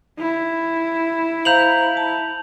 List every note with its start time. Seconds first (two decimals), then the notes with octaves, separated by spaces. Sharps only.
0.19 E4
1.45 C5 F5 A#5 G6 F7 F#7
1.97 A5